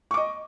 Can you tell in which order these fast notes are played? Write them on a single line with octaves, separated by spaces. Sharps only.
C#6 D6 D#5